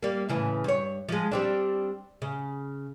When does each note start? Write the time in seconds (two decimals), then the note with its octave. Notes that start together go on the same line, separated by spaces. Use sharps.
0.03 G3 A#3
0.29 A2 C#3 E3
0.64 G2 C#5
1.09 F3 G#3
1.31 G3 C4 D4
2.22 C#3